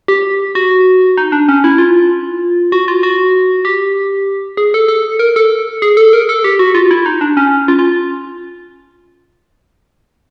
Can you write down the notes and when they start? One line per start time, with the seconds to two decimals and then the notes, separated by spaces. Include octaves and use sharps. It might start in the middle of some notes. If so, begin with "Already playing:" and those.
0.08 G4
0.55 F#4
1.17 D#4
1.32 D4
1.48 C#4
1.64 E4
1.78 F4
2.72 F#4
2.88 F4
3.03 F#4
3.65 G4
4.57 G#4
4.74 A4
4.88 A4
5.19 A#4
5.36 A4
5.82 G#4
5.97 A4
6.13 A#4
6.29 A4
6.44 G4
6.59 F#4
6.75 F4
6.91 E4
7.06 D#4
7.21 D4
7.37 C#4
7.68 F4
7.79 F4